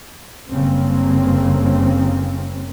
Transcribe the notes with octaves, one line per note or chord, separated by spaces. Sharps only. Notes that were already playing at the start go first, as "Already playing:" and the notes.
F#1 G2 C#3 A#3 C4